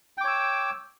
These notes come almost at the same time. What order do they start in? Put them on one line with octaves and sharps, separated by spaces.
G5 D6 C#5 E6